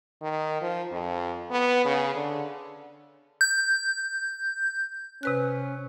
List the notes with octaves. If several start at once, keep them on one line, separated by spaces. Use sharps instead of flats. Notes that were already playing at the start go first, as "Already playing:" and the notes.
D#3
F3
F2
B3
C#3
D3
G6
C3 C#4 B4 F#6